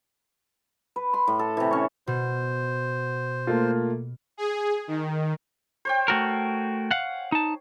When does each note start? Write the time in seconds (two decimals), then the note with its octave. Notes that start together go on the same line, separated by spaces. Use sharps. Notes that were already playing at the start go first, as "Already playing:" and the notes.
0.96 B4
1.13 B5 C6
1.27 A2
1.39 A4
1.57 C3 E3
1.71 C#4 C#5
2.07 B2 C5
3.47 A3 A#3 F4
4.37 G#4
4.88 D#3
5.85 C5 C#5 G5
6.08 A3 F#4 A#4
6.91 F5 F#5
7.32 D#4 A5